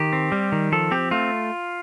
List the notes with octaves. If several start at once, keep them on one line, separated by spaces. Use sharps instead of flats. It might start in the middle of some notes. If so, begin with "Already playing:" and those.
Already playing: D#3 G4
C4
G3
D#3
F3 A4
C4 G4
A3 F4